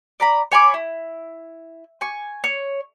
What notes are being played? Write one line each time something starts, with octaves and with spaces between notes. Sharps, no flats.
D5 A#5 B5
C#5 G#5 B5 D6
E4
G#5 C#6
C#5